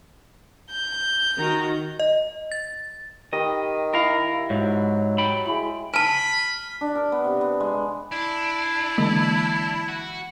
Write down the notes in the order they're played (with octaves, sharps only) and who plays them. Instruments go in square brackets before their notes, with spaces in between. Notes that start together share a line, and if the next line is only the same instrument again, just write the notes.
[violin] G6
[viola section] D#3 F#4 A#5
[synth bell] D#5
A6
[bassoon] D#3 [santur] G4 B5 [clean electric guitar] D#5
[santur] E4 [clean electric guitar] A#4 F5
[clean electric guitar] G#2 [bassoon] F#3
[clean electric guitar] G5 B5
[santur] G#3 E4
[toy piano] G#5 A5 [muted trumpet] B5 [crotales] F6 B6
[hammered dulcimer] D4
A#4
B3
C3
B3
G#3
[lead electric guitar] D4 [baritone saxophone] E4
[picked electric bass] D3 G#3 A#3 [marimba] E3
[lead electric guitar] F#4